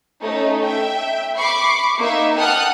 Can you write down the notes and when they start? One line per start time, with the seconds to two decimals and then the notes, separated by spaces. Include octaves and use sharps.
0.23 A3 C#4 D#4
0.64 E5 G5
1.37 B5 C#6 D6 C7
1.99 A#3 D#4 E5
2.37 F#5 G5 A5 D#6 F6 F#6